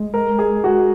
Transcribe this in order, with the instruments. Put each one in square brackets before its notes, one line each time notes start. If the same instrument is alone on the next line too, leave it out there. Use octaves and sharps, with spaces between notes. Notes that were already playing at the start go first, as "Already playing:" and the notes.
Already playing: [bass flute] G#3
[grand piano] A#4
G#4
F#4